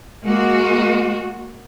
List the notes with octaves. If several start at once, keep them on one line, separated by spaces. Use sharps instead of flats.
G#3 A#3 F#4